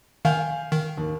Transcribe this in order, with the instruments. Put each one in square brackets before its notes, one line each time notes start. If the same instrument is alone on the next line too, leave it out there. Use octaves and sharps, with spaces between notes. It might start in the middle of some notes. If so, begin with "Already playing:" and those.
[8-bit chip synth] D#3 [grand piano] F5 G#5 G6
[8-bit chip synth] D#3
[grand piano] D#2